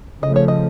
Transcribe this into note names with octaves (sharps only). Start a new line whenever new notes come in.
C#3 F3 A3 D#5
C#5
D#5